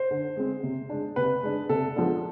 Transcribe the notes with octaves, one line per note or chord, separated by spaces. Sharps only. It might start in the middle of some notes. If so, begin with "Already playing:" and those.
Already playing: C5
D3
G#3 C4
C3
G#3 D4
C3 B4
G#3 D4
C3 A4
F3 G#3 B3 D4